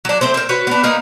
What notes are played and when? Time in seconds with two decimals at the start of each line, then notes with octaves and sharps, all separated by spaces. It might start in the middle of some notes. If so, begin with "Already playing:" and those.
0.05 F#3 D4
0.21 A3 C4 C5
0.34 C4 A#4
0.49 F#4 B4 C#5
0.67 B3 D4
0.83 A#3 B3 D#4 F5